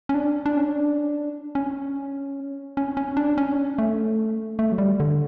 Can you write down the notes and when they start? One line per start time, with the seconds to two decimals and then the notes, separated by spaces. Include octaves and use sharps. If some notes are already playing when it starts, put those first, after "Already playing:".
0.09 C#4
0.14 D4
0.46 D4
0.57 C#4
0.68 D4
1.55 C#4
2.77 C#4
2.97 C#4
3.17 D4
3.38 C#4
3.52 D4
3.58 C#4
3.78 A3
4.59 A3
4.72 F#3
4.78 G3
5.00 D3